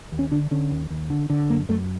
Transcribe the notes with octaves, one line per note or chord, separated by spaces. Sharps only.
D#2
C#4
D3 D4
D3 C#4
D#2
D#2
D3
D3
F#2 A#3
F#2 A3